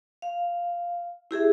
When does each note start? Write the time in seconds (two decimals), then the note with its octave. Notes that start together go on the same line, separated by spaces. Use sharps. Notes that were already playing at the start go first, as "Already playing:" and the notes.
0.22 F5
1.31 E4 G4 G#4 E5